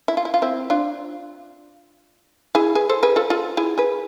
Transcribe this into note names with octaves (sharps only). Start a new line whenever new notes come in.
E4
F4
E4
F4
C4 E4
D4 F4
E4 G#4
G#4 B4
A4 C5
G#4 B4
F4 A4
F4 A4
E4 G#4
G#4 B4